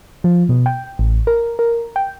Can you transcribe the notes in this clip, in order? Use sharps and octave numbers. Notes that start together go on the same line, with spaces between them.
F3
B2
G5
A1
A#4
A#4
G5